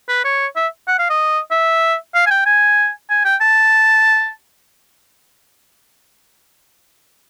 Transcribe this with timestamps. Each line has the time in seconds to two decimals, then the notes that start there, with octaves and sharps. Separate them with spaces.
0.08 B4
0.24 C#5
0.56 E5
0.88 F#5
0.98 F5
1.10 D#5
1.51 E5
2.15 F5
2.26 G#5
2.31 G5
2.46 G#5
3.10 G#5
3.25 G5
3.41 A5